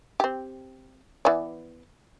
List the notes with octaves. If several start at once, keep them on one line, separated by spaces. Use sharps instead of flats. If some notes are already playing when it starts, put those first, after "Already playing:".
C4 G4
E3 B3 D5